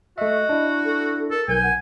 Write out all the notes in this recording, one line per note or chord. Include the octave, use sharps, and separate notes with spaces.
A3 F#4 D#5 E5
D4 E4
A4
A4 A#4
B1 A#4 G#5 G6
F#5